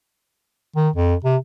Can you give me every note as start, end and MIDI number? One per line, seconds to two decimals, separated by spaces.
0.77 0.89 51
0.96 1.14 41
1.24 1.36 48